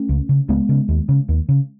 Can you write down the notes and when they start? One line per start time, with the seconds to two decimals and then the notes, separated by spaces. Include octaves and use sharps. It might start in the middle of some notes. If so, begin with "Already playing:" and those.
Already playing: A3 C#4
0.09 C#2
0.29 C#3
0.49 C#2 G#3 B3
0.69 C#3
0.89 D#2
1.09 C#3
1.29 D#2
1.49 C#3